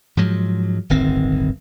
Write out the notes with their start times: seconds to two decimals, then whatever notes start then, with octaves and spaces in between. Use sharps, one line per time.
0.17 G#2 F3 F#3 G#3
0.90 D1 G1 D#3 C4